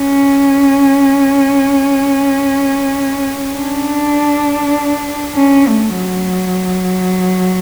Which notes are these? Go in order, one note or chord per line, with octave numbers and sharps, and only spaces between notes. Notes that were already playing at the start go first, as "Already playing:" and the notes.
Already playing: C#4
D4
C#4
A3
F#3